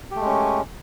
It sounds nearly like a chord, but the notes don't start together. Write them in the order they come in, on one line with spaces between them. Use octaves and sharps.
G4 A3 G#3 C#4